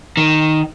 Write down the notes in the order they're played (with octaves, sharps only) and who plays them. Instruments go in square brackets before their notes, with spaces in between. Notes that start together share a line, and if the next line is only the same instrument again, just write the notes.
[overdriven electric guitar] D#3